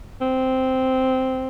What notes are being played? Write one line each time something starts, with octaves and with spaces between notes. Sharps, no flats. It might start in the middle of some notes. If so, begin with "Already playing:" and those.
C4